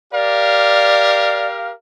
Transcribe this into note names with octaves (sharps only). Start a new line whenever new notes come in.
G4 A#4 D5 F5